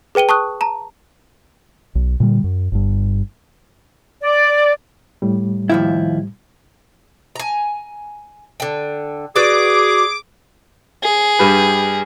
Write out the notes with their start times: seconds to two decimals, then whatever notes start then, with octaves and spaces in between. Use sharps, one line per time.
0.15 G#4 B4 G5 D#7 G7
0.29 A5 C#6 D#6 F#6
0.61 A5 A#5
1.95 B1
2.20 A#2 D3 F3 G3
2.44 F#2
2.72 G1 G2
4.21 D5
5.22 A2 G3
5.70 D#2 F3 E4
7.36 G#5 A#5
8.60 D3 G5
9.36 F#4 G#4 B4 D5 D6
11.03 G#4
11.39 G2 G3 B4